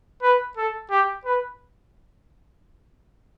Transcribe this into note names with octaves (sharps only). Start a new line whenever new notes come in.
B4
A4
G4
B4